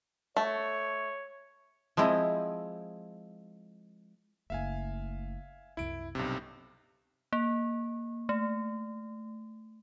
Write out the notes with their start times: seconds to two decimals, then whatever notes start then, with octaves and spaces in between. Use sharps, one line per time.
0.36 A3 C#5
1.97 F3 G#3 C4 E4 D#5
4.50 F#1 A3 E5 F5 G#5
5.77 C2 F#2 E4 D7
6.15 B1 G2 C3 D#4
7.33 A#3
8.29 A3